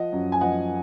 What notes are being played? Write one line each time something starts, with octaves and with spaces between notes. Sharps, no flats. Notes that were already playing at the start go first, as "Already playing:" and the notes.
Already playing: F3 D#5 F#5
F#2
G#5
F3 D#5 F#5